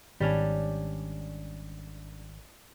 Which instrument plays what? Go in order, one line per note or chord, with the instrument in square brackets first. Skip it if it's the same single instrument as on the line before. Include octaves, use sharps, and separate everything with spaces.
[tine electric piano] G#1 [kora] G3 C#4 D4